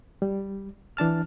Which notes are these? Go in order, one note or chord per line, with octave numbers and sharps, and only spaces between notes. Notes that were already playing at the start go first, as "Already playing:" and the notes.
G3
E3 D4 A5 F6